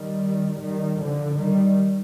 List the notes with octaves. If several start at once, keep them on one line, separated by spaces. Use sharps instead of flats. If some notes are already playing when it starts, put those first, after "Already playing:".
Already playing: D#3 G3
D#3 G3
D3 F3
D#3 G3